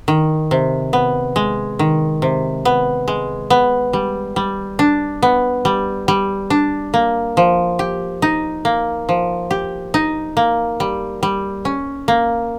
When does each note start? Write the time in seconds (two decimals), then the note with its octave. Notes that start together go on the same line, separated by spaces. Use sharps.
0.08 D#3
0.51 C3
0.93 B3
1.36 G#3
1.79 D#3
2.22 C3
2.65 B3
3.08 G#3
3.50 B3
3.93 G3
4.36 G3
4.79 D4
5.22 B3
5.65 G3
6.08 G3
6.50 D4
6.94 A#3
7.37 F3
7.79 G4
8.22 D#4
8.65 A#3
9.09 F3
9.51 G4
9.94 D#4
10.37 A#3
10.80 G3
11.23 G3
11.65 C#4
12.08 A#3